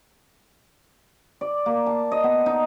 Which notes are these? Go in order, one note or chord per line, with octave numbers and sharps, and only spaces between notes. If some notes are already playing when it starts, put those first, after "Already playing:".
D5
A#3
A5
D#5
B3
D#4